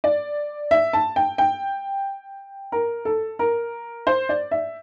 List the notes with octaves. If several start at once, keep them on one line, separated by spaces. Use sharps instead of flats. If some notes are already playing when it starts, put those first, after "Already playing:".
D5
E5
A5
G5
G5
A#4
A4
A#4
C5
D5
E5